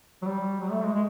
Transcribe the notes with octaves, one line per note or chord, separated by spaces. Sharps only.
F#3
G3
F#3
A3
G#3
G#3